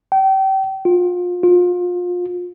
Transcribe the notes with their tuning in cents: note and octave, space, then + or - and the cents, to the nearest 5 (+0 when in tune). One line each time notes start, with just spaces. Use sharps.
G5 -30
F4 +30
F4 +30